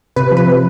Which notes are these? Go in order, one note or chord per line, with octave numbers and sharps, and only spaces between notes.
C3 B4
F3
B4
C3